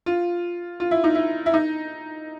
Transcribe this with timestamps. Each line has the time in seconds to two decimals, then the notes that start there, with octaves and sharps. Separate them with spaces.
0.06 F4
0.80 F4
0.91 E4
1.04 D#4
1.15 E4
1.46 E4
1.54 D#4